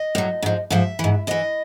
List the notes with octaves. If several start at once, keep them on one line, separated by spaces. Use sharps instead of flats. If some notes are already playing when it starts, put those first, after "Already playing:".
Already playing: D#5
A2 F#3
G#2 F3
G#2 F3 E5
G#2 E3
G#2 E3 D#5